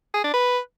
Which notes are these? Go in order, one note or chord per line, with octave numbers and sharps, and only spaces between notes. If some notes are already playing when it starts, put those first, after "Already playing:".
G#4
D4
B4